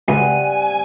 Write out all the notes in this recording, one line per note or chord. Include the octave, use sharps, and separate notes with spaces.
C#2 G2 C3 F#5 G#5